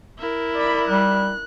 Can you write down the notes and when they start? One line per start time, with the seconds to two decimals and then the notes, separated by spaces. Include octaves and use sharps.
0.19 E4 A#4
0.56 D5 B5
0.88 G3 F#6